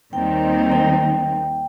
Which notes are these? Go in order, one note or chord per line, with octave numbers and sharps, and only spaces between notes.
D#2 D#3 G3 C4 D#4 G5
G5